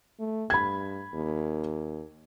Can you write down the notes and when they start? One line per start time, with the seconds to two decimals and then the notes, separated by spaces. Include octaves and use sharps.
0.19 A3
0.50 G2 B5 G#6
1.14 D#2